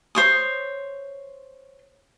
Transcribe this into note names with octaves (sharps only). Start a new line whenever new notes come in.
C5 C#5 D#6